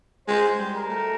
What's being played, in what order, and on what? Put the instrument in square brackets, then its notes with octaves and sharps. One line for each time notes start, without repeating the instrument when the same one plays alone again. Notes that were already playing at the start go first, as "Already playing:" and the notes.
[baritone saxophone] G#3 [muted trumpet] C5
[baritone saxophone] G3
[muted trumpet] A#4
[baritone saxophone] A3